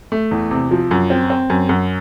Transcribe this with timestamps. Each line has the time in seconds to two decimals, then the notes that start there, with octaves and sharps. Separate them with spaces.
0.12 A3
0.31 E2
0.51 C3
0.71 F3
0.91 F#2
1.10 C4
1.30 C4
1.50 F#2
1.69 F#2